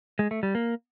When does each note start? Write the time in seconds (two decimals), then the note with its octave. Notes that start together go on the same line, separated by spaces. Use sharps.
0.19 G#3
0.31 A3
0.43 G3
0.55 A#3